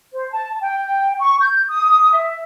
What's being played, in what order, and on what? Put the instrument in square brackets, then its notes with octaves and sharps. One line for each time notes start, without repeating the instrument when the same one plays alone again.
[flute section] C5
A5
G5
C#6
G6
D#6
E5